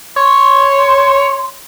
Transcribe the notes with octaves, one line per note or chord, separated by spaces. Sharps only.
C#5 C6